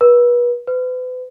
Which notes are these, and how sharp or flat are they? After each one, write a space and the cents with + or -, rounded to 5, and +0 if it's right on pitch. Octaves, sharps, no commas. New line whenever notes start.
B4 -35
B4 +40